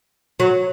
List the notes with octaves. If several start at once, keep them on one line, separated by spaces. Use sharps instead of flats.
F#3